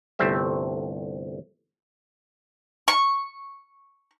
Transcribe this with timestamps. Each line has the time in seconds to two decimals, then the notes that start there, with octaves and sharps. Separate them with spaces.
0.19 G1 C2 A3 C4 E5
2.88 C#6